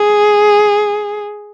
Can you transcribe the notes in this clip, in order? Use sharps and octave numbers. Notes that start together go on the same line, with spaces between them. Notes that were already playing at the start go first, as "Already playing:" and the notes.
Already playing: G#4